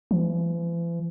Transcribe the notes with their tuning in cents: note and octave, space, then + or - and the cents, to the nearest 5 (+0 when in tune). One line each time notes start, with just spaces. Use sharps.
E3 +45